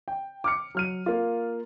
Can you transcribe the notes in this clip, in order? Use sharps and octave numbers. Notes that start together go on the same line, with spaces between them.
G5
D6 F6 C#7
F#3 F6 D#7
A#3 F4